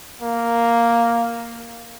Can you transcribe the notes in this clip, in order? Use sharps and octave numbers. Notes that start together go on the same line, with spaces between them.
A#3